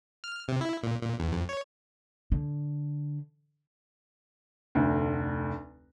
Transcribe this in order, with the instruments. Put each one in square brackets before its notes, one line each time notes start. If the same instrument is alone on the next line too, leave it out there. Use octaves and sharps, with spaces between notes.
[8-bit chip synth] F6
C3
E4
A#2
A#2
E2
F2
C#5
[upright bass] D3
[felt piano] F1 D2